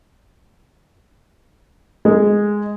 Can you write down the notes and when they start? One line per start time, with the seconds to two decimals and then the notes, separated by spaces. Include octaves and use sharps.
2.05 G#3